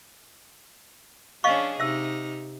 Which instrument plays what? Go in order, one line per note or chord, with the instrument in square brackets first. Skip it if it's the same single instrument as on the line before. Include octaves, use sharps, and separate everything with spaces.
[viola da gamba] C#4 D4 G#4 [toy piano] D#5 F5 C#6
[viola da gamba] C3 D#4 [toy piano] E5 E6